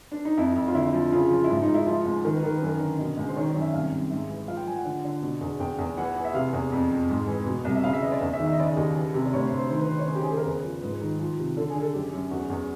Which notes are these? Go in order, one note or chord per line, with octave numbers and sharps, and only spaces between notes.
D4
D#4
F2 E4
F2
F4
D3 E4
F3
C#3 F4
F3
E4
G#2 F4
D#4
G#2
E4
F3 F4
C#2
D#3 A#4
B4
D#3 A#4
B4
F#2 A#4
D3
B2 D#5
C#2
C5
D#3 C#5
D5
F#2
E5
C2 F5
C2
G#2 E5
E3
F3 F5
G5
F3 G#5
F#5
D3
D3
B2
E2
E2 G5
E2
E3 F#5
E3
E5
C3 F5
E2
F2
F2
G#2
E3
B2
C2
E5
C#3 F5
E5
E3 D#5
D5
E2
E5
D#3
E5
D#5
C#3 D5
D#5
D#2
E3
C3
D5
D2 C#5
C5
D2
C5
D#3 C5
B4
D#3 C5
C#5
C#3 C5
G4
G#4
C#3 A4
A#4
E2 B4
F3
G#2 B4
D#3
F3
C3
D3 A4
G#4
D3
A4
F#2 G4
F#2
E2 F#4
E2